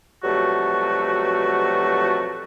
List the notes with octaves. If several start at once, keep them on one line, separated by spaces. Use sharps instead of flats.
F2 B2 F#3 G3 A3 F#4